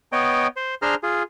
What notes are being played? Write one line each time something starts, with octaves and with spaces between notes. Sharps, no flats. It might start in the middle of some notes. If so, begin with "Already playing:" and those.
B3 C#5 D#5 G5
C5
D4 G#4 C5 A#5 F6
F4 G#4